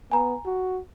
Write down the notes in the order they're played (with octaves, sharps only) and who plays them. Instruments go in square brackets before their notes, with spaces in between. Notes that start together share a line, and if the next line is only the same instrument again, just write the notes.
[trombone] B3 [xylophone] G#5 A#5
[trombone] F#4